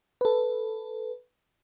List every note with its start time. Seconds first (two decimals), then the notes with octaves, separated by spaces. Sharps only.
0.21 A4 B4